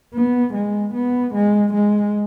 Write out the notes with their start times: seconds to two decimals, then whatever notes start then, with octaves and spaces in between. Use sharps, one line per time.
0.14 B3
0.54 G#3
0.94 B3
1.34 G#3
1.73 G#3